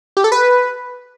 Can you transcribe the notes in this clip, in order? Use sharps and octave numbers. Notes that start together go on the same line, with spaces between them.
G4
A4
B4